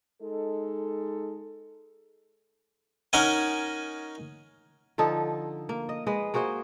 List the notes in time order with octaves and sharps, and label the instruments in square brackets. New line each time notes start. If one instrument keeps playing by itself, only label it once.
[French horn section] G#3 D#4 A4
[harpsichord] C#4 D#4 A#4 D#5 F#5 G#5
[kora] D3 F3 D#4 A4
A#3
D#5
G#3 B4 D#5
A#3 F#4 G#4 C5